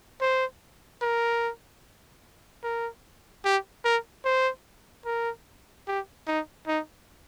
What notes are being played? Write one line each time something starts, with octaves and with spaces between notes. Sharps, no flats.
C5
A#4
A#4
G4
A#4
C5
A#4
G4
D#4
D#4